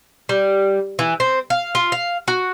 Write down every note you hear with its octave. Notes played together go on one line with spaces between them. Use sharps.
G3
E3
C4
F5
F4
F5
F#4